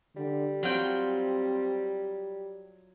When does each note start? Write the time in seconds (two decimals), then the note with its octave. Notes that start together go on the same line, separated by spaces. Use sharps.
0.16 D3 G3
0.63 F#3 C4 F4 G5